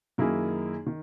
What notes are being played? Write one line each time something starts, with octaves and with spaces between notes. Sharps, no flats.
F#2 D#3 A#3 E4 G#4
D#3